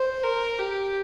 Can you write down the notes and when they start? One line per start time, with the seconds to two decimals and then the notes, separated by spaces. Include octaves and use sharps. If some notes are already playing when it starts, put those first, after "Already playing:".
Already playing: C5
0.23 A#4
0.59 G4